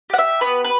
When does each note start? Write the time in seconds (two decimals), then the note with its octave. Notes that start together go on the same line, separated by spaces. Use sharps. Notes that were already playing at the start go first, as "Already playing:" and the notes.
0.10 G4 F#5
0.18 E5
0.41 B3 B4
0.65 B4